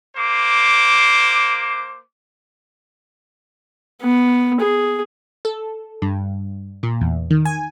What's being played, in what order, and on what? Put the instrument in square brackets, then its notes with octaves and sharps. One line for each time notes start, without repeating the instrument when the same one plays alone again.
[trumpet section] A#3 C5 D6
[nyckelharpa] B3
G#4
[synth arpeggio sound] A4
G2
A#2
E2
D#3
G#5